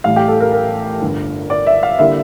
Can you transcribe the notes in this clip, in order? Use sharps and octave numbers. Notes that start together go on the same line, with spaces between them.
A1 A2 G3 F5
G4
A4
A#4
A#4
G1 G2 D3
D5
E5
F5
D3 G3 A#3 E4 E5